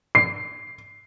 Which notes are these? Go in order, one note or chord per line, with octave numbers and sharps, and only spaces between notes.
C7